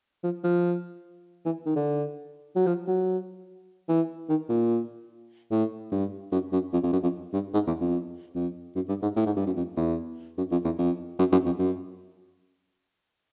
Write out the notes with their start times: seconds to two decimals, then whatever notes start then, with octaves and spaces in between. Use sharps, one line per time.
0.23 F3
0.44 F3
1.45 E3
1.66 D#3
1.76 D3
2.56 F#3
2.67 F3
2.87 F#3
3.89 E3
4.29 D#3
4.49 A#2
5.51 A2
5.92 G2
6.32 F#2
6.52 F#2
6.73 F2
6.83 F2
6.92 F#2
7.03 F2
7.33 G2
7.54 G#2
7.67 E2
7.81 F2
8.35 F2
8.75 F#2
8.89 G2
9.02 G#2
9.16 A2
9.26 G#2
9.37 G2
9.46 F#2
9.56 F2
9.76 E2
10.38 F#2
10.51 F2
10.64 E2
10.78 F2
11.19 F#2
11.32 F#2
11.45 F2
11.59 F#2